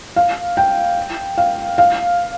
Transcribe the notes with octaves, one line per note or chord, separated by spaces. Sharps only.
F5
G5
F5
F5